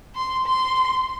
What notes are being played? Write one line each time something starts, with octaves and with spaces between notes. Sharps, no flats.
C6
C6